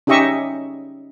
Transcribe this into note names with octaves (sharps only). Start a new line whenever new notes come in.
C#4 D#4 G4 D#5 E5 C#6